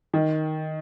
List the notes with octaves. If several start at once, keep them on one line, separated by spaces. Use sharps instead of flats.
D#3